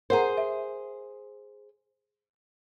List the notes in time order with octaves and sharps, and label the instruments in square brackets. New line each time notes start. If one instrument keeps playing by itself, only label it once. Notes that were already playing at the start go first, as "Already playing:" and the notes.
[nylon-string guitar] G#4 C5 [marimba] A#4 F#5 A#5
[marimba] E5